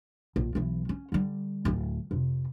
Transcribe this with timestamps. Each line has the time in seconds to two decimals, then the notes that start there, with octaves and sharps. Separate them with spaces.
0.36 A#1
0.55 B1 E3
0.89 C#4
1.12 D3 G3
1.65 D1 D2
2.11 F2 C3